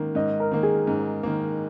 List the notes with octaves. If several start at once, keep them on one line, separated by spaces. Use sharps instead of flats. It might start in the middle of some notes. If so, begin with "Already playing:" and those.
Already playing: G#2 D#3 A#3
G#2 D#5
A#4
D#3 A#3
G#4
G#2
D#3 A#3